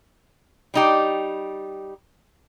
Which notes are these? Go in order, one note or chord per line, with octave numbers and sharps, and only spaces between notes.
G3 D#4 G4